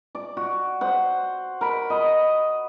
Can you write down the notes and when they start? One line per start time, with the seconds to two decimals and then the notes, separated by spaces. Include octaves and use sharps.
0.15 D5 D6
0.37 F#4
0.81 C5 F#5
1.61 A#4 B5
1.90 D#5 B5